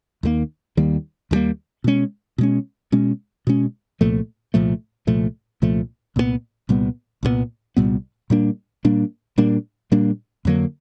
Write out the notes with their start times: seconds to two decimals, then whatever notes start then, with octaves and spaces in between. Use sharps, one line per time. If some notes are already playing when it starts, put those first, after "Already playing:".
0.23 D#2 D#3 G3 A#3
0.77 D#2 D#3 G3 A#3
1.31 D#2 D#3 G3 A#3
1.84 B2 G#3 C#4
2.38 B2 G#3 C#4
2.92 B2 G#3 C#4
3.47 B2 G#3 C#4
4.01 C2 A#2 F3 A3
4.54 C2 A#2 F3 A3
5.07 C2 A#2 F3 A3
5.62 C2 A#2 F3 A3
6.16 C2 A#2 G3 B3
6.69 C2 A#2 G3 B3
7.23 C2 A#2 G3 B3
7.77 C2 A#2 G3 B3
8.30 A#2 G3 A#3 D4
8.85 A#2 G3 A#3 D4
9.38 A#2 G3 A#3 D4
9.92 A#2 G3 A#3 D4
10.45 F2 D3 F#3 A#3